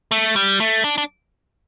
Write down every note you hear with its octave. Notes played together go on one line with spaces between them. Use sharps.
A3
G3
A3
D4
D4